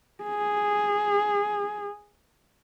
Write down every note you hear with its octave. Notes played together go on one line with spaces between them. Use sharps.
G#4